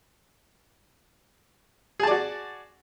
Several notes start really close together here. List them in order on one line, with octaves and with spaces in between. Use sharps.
G#4 A5 D5 F#4